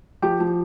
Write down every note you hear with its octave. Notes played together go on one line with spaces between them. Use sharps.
F3 G4
F3